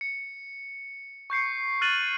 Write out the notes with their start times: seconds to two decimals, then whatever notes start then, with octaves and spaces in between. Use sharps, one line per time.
0.01 C#7
1.30 C#6 G6 C7 C#7
1.81 F6 F#6 A6 D#7 F#7